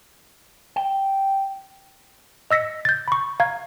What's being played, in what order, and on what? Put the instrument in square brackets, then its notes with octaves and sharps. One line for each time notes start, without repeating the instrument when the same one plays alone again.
[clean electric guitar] G5
[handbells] D#5 E6 A#6 B6 C#7
G6 A6
B5 C#6
F5 A#5 G#6